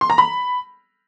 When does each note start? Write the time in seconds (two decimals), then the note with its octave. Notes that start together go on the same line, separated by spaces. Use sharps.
0.01 C6
0.10 A#5
0.18 B5